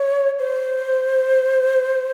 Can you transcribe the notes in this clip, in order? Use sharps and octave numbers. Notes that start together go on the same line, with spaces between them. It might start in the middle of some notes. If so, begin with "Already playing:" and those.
Already playing: C#5
C5